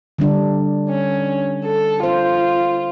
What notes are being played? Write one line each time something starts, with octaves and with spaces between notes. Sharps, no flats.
D3 G3 D4
C#4
A4
F4 C5